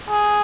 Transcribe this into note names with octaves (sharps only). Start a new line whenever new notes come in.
G#4